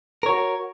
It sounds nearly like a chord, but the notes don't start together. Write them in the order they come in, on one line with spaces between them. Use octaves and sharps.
A#4 C#5 F#4